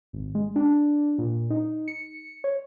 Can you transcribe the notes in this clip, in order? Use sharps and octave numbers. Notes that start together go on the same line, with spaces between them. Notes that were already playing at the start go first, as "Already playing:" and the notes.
G#1
G#3
D4
A#2
D#4
C#7
C#5